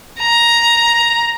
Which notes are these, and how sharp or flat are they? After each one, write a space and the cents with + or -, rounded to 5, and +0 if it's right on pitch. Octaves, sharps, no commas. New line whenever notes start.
A#5 +10